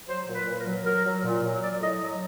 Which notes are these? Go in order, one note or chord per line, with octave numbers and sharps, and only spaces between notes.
F#3 C5
A#2
B4
A#2
B4
A#4
F#3
F#3 A#4
F#3
A#2
F#3
F#3 D5
A2 D#5
F#3